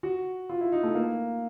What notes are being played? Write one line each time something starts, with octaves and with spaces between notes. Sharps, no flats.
F#4
F4
E4
D#4
A3
A#3